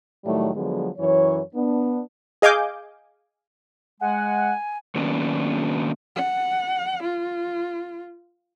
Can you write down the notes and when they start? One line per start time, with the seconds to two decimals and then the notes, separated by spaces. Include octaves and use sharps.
0.25 A2 D#3 F#3 G3 A3
0.54 D3 F3 F#3 G#3 B3
0.98 F#2 E3 C#5
1.55 B3 D4
2.42 G#4 D#5 F5 G#5 D6 G6
4.01 G#3 F#5 G#5
4.95 D#3 F#3 A#3 B3 C#4 D4
6.16 F#5
7.03 F4